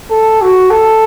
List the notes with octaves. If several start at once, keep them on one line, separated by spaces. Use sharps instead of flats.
A4
F#4
A4